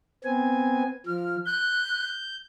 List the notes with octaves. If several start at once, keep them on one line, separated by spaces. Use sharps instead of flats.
B3 C4 G#5
F3 F6
F#6 G6